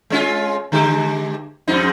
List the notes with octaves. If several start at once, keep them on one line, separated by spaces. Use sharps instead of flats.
G#3 C#4 F4
D3 G#3 G4
F2 G#2 D#4